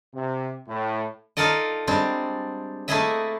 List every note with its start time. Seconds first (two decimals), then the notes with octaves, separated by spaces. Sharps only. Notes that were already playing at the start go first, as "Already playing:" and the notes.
0.14 C3
0.68 A2
1.37 D#4 F4 A4 A#4 D5 D#5
1.87 G3 G#3 C4 D4
2.88 A3 A#3 E4 G#4 D#5 E5